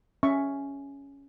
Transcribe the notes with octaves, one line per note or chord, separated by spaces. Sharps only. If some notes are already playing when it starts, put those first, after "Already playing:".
C#4 E5 C#6